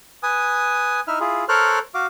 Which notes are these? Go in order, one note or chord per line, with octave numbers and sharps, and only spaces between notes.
B4 G#5 D#6
D#4 E4 E5 F6
E4 F4 G#4
A4 A#4 C5 C#5 F6 F#6
F#4 F5 D6